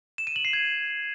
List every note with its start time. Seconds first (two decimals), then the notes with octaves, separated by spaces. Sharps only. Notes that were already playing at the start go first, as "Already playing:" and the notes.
0.18 E7
0.27 D#7
0.36 F#7
0.45 C7
0.53 G#6